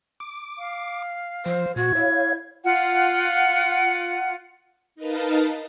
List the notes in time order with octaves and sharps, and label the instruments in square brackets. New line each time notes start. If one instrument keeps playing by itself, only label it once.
[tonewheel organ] D6
[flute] F5
[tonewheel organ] F3 [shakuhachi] C5
[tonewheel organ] A#2 [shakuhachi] F#4 [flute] G#6
[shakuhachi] E4 [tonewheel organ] C#5 F5
[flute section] F4 F#5
[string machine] D#4 A#4 B4 D#5 F5 A5